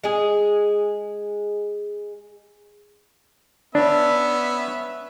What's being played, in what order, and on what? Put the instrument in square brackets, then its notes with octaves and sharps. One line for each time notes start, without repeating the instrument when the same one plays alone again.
[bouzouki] G#3 G#4
[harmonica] B3 C#4 E5 [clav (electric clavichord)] D4